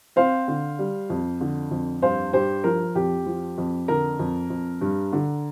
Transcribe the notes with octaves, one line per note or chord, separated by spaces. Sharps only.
C4 C5 F5
D3
G3
F2
D3
F2
G2 C5 F5
G2 G4 C5
F3 A#4
F2 G4
F3
F2
D3 A#4
F2
F2
G2
D3